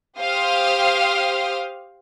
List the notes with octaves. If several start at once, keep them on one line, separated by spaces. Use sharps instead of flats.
G4 C5 F5 C6 D#6 F6